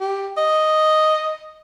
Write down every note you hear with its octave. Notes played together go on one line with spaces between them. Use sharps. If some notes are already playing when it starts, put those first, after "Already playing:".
G4
D#5